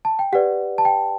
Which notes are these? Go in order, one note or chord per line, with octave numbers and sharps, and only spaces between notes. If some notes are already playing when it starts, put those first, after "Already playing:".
A5
G5
G4 B4 D5 F#5
A5
G5